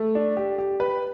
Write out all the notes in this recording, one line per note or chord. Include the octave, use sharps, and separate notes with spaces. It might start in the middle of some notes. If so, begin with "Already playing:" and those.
Already playing: A3
D4
G4
G4
B4